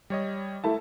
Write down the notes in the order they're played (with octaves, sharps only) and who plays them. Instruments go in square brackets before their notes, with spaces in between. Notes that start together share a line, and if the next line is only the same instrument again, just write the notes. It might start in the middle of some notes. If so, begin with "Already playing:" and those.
[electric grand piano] G3 C#5 D#5
[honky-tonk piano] A3 E4 A5